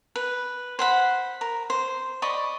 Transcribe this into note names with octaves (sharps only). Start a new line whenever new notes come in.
B4
C5 F#5 B5
A#4
C5
D5 D#5 B5 C#6